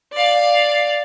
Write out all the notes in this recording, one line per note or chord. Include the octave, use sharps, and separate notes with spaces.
D5 F5